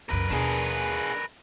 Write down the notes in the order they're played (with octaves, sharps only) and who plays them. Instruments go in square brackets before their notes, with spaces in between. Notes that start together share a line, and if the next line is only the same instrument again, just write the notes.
[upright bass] C#2 F#2 [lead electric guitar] A#4 B4
[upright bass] D#2 B2 [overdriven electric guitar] D4 G#4